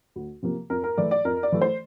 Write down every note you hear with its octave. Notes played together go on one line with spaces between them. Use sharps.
D2
C3 F3 A#3
F2 A#4
A#4
E3 A3 D5
D5
F2 A#4
D5
E3 A3
C5